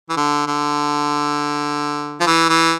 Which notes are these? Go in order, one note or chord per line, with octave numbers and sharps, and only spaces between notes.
E3
D3
D3
F3
E3
E3